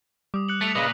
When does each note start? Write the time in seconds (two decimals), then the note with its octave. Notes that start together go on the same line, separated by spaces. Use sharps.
0.34 G3 D6 D#6
0.49 F#6 C#7 F#7
0.61 A3 B6 C#7 F7
0.75 A#2 C#3 B4 D#5 D#6